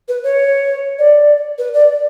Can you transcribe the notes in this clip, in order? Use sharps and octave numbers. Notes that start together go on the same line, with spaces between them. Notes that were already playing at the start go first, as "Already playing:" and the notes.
B4
C#5
D5
B4
D5